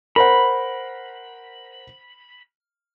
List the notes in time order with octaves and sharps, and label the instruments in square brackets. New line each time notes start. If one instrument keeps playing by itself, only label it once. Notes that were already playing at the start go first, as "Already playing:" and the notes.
[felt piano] A#4 C5 F#5 [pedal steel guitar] B5